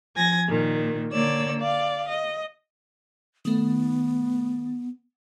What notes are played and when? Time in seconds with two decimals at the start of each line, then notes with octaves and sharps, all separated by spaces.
0.16 F3 G#5 G#6 A#6
0.49 A#2 D#3
1.13 D3 A#3 C#5 D5 E6
1.61 D5 F5
2.08 D#5
3.45 D#3 A3 B3